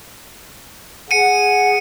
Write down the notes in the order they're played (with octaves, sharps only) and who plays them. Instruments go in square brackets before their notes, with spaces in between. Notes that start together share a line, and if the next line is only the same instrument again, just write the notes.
[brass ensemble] G#4 F#5 [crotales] C#7 D#7